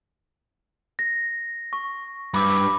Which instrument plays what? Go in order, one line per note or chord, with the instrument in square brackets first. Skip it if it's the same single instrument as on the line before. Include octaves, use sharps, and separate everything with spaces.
[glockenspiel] A#6
C#6
[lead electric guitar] G2 [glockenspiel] B5 D6